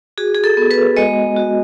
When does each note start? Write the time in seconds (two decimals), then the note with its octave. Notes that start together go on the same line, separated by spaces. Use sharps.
0.18 F#4 G#4
0.34 G#4
0.44 A4
0.57 B3
0.71 B4
0.97 G#3 D#5
1.37 F#4